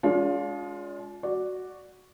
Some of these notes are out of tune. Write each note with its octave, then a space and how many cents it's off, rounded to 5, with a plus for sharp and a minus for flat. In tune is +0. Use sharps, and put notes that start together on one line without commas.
G#3 +0 D4 -45 F4 +25
F#4 +0 D5 +0